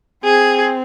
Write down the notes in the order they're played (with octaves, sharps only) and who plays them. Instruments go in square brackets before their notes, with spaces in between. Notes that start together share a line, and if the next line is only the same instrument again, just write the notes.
[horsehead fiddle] C4 [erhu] G#4